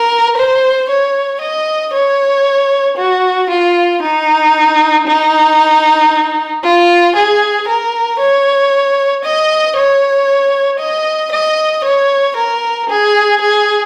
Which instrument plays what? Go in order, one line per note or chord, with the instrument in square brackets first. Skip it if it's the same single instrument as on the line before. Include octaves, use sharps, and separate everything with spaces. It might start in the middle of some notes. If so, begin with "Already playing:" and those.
Already playing: [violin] A#4
C5
C#5
D#5
C#5
F#4
F4
D#4
D#4
F4
G#4
A#4
C#5
D#5
C#5
D#5
D#5
C#5
A#4
G#4
G#4